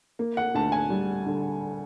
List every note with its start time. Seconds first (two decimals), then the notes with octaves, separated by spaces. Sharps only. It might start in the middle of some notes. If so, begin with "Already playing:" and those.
0.19 A#3
0.37 F#5
0.55 D2 A5
0.72 G#5
0.90 G3
1.26 D3